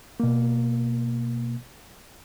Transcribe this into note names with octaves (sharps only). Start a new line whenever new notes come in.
B2 A#3